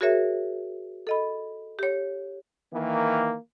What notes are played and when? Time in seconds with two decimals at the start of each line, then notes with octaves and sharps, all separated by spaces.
0.01 F#4 G#4 A#4 C#5 E5
1.07 A4 D#5 B5
1.79 G4 C#5
2.74 D#3 E3 A#3